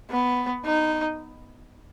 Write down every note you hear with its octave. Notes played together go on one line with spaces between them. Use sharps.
B3
D#4